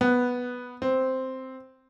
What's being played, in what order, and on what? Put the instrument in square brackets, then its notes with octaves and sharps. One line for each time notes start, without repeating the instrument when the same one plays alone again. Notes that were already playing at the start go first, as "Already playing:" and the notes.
[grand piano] B3
C4